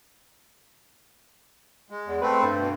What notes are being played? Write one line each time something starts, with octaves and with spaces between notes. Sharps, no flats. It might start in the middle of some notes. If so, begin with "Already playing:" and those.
G#3
E2
A3 C4 B4
G2
B2